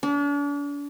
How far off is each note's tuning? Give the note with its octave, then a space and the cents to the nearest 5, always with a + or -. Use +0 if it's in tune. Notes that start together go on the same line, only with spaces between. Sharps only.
D4 -40